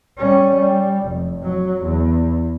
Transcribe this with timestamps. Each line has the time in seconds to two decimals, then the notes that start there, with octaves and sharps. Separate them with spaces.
0.18 G3 C#4
0.55 G3
1.07 F1
1.43 F#3
1.84 E2